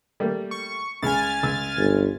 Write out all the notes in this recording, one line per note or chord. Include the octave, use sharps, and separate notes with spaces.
G3 A3 A#3
C#6
C#2 C#3 G#5 F6 A6
C#2 E6
G1